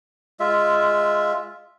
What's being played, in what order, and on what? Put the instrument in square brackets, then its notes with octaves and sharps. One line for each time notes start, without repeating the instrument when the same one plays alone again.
[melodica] G#3 F4 E5